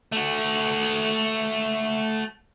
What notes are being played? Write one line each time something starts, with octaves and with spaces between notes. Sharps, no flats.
A3 F#4